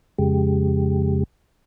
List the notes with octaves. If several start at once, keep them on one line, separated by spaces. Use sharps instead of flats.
F2 C#3 G#3 G4